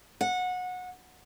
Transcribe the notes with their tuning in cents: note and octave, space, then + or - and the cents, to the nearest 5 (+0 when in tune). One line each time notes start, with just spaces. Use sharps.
F#5 -20